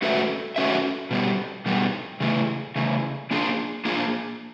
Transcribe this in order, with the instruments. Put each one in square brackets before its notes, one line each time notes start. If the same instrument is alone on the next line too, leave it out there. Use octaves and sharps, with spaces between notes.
[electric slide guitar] A3 C#4 F#4 B4 E5
A3 C#4 F#4 B4 E5
B2 G3 B3
B2 G3 B3
C#3 E3 A3
C#3 E3 A3
A#3 D4 F4 G#4
A#3 D4 F4 G#4